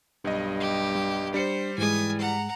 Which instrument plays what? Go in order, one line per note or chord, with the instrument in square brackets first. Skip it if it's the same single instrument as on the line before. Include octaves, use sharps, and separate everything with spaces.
[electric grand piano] B1 D#5 [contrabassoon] G2
[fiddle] G4
[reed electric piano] G3
[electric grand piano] G3 C#7 [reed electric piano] D4 [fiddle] C5
[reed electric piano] G#2 G#3 [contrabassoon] E3 [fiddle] G#5 D#6
[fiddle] F#5 A#5